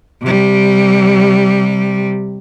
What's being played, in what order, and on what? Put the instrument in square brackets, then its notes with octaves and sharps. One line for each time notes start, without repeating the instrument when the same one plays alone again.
[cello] C3 G3